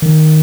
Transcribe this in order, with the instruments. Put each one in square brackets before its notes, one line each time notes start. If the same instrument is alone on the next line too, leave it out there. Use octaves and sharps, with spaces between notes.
[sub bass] D#3